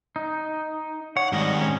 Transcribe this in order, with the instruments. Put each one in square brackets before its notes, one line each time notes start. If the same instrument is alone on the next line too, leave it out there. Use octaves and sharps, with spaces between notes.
[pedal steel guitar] D#4
[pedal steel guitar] C#5 [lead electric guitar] F#5
[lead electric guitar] G#2 D#3 [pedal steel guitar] G3 D#5
[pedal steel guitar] C#4